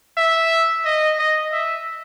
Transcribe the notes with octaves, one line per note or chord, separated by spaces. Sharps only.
E5
D#5
D#5
E5